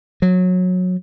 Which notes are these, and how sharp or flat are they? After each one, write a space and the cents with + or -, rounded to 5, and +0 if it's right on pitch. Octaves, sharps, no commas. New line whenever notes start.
F#3 -20